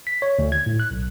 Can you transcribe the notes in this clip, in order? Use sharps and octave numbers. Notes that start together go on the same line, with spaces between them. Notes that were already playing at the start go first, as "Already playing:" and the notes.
B6
C#5
D2
G#6
A2
F#6
B1